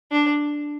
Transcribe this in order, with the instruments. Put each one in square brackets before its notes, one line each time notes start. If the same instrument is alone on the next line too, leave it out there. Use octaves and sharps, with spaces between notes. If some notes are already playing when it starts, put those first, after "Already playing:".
[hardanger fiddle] D4